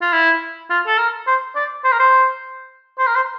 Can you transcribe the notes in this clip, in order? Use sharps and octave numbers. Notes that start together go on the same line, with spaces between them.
F4
E4
F4
A4
A#4
C5
D5
C5
A#4
C5
C5
A#4
C5